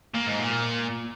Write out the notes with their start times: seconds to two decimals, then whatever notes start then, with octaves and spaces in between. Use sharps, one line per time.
0.14 A#2
0.26 G#2
0.39 A#2